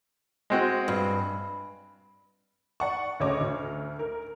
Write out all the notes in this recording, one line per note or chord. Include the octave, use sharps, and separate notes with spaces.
G#3 C4 F#4
G2
D5 F#5 C#6
D2 C#3 C#5 D#5 D6
D2
A#4